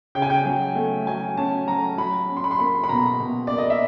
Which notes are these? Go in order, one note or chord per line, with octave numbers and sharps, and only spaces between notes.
C#3 G5
G#5
G5
F#3
A3
F#3 G#5
C#4 A5
F#3 A#5
F#3 B5
C#4
C6
B5
C6
A#3 B5
B5
B2 A#5
B2
A#3 D5
D#5
E5